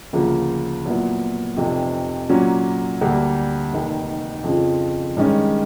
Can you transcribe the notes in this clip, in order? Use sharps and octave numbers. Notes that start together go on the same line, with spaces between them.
D2 C#3 F3 A#3
A#2 F#3 B3 E4
F1 F2 C3
A#2 F#3 A#3 C#4
D2 D3 G3 A#3
F1 D#2 D#3
F2 C#3 F3
G2 D#3 G#3 C#4